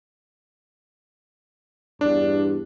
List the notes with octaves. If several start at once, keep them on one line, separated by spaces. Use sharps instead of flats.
E2 G2 D4